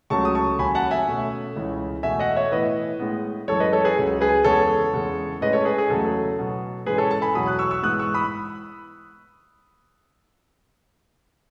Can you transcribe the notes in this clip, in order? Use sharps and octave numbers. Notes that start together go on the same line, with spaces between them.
C#2 C#3 F#3 A3 C#4 A5 C#6
D#6
A5 C#6
D#2 C#3 F#3 G#5 B5
F#5 A5
E5 G#5
B2 A3 C#4
C#2 C#3 E3
E2 B2 A3 E5 G#5
D#5 F#5
C#5 E5
A2 E3 B3 B4 D#5
A2 G#3 B3
F#2 E3 G#3 A4 C#5
B4 D#5
A4 C#5
G#4 B4
C#2 C#3 F#3
G#4 B4
E2 C#3 G#3 B3 A4 C#5
E2 C#3 G#3
A2 G#3 C#4 B4 D#5
A4 C#5
G#4 B4
G#4
E2 C#3 F#3 A3 A4
B2 F#3 B3
G#2 E3 G#3 C#4 G#4 B4
A4 C#5
A5
G#5 B5
E2 B2 F#3 B5 D#6
D#6 F#6
C#6 E6
C#6 E6
G#2 E3 B3 D#6 F#6
C#6 E6
B5 D#6